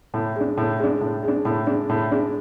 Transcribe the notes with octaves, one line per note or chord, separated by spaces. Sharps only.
A2
G#3 D4
A2
G#3 D4
A2
G#3 D4
A2
G#3 D4
A2
G#3 D4